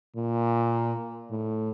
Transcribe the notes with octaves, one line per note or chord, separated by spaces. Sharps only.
A#2
A2